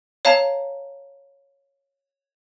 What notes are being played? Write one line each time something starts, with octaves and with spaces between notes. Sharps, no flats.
C#5 F5 A5 A#5